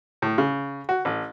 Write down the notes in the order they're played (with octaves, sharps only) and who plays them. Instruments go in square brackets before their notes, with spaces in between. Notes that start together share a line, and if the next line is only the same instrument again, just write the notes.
[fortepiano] A2
C#3
F#4
A1